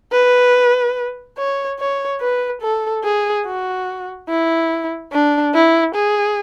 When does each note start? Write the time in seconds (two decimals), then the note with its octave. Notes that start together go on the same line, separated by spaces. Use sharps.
0.13 B4
1.38 C#5
1.80 C#5
2.21 B4
2.62 A4
3.04 G#4
3.46 F#4
4.29 E4
5.13 D4
5.55 E4
5.96 G#4